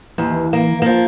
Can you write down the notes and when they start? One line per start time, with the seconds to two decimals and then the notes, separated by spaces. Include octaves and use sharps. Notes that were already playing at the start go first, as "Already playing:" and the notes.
0.18 D#2 E3
0.53 A#3
0.82 F3 A#3